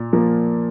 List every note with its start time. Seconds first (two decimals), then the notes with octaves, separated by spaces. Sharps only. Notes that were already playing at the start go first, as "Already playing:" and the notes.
Already playing: A#2
0.13 F3 A#3